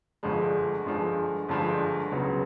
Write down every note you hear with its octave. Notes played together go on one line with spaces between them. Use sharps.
G1 G2 D3 F3 G#3
G1 G2 D3 F3 G#3
G1 G2 D3 F3 G#3
C#2 C#3 F#3 B3